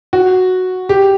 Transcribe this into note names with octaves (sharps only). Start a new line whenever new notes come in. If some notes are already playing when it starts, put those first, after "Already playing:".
F#4
G4